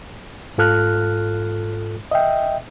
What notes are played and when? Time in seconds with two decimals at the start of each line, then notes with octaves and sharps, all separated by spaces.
0.58 G#2 F4 A4 F6 F#6
2.11 D#5 E5 G5